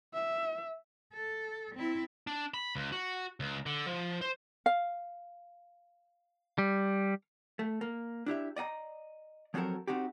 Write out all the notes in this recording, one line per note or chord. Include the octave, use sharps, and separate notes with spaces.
E5
A4
C4 E4
D4
B5
C#2
F#4
C#2
D3
F3
C5
F5
G3
A3
A#3
D4 E4 G4 E5
D5 D#5 F#5 A#5
F3 F#3 C4 F#4 A4 A#4
C4 D#4 F#4 G4